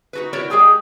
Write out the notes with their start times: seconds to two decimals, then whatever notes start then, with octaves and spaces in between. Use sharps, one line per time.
0.13 D#4 F#4 B4
0.33 E4 F#4 A#4 C#5 D5
0.50 G#3 G4 G#4 G5